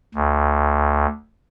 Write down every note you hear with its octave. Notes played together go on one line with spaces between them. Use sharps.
D2